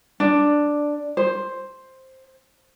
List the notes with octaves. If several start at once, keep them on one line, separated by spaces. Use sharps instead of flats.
D4
C5